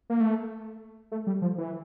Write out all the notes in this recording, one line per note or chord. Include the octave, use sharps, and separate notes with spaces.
A#3
A3
A3
G3
F3
E3